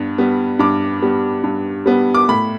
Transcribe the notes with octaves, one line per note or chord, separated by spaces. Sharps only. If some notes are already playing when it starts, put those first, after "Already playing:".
Already playing: G2 B3
G3 B3
G2 D6
G3 B3
G2
G3 B3
D6
A2 B5